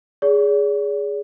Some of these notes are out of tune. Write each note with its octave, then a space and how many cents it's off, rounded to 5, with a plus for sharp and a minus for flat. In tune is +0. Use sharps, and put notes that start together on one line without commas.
G#4 +0 D5 -45